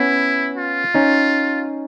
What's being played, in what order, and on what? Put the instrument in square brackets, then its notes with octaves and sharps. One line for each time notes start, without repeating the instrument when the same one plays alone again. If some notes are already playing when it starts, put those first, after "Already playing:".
Already playing: [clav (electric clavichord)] B3 C#4 [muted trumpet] E4
[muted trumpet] F4
[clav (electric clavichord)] C#4 D#4